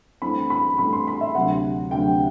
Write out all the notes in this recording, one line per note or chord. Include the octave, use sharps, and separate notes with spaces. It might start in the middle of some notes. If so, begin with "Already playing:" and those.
G2 E3 A3 C4 B5
B5
G2 E3 A3 C4 B5
C6
B5
E5
D2 C3 F#3 F#5
D2 C3 F#3 G5